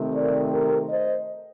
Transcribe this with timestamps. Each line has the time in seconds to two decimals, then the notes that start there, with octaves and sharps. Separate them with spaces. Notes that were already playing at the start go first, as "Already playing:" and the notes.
Already playing: C3 D#3 A3 C4
0.13 A#4 D5
0.52 G4 A#4
0.89 C5 D#5